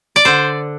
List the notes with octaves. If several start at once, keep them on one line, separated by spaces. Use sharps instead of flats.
D5
D3 C5